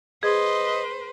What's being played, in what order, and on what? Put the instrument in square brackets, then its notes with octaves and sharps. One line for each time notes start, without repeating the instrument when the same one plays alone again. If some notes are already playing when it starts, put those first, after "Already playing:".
[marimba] G#4 [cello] B4 C5 [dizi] D#5